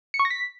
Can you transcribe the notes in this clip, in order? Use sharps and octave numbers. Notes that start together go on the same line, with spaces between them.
C#7
C#6
A#6
B6